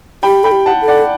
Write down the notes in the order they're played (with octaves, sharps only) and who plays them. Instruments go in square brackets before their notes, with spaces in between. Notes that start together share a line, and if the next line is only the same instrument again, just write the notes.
[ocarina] G4 [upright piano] G5 B5
[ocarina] A4 [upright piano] G5 B5
[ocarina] G4
[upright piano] F#5 A5
[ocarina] A4
[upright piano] D5 F#5